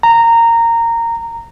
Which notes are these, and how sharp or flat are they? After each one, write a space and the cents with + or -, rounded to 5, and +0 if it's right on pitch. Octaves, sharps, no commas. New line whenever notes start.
A#5 -15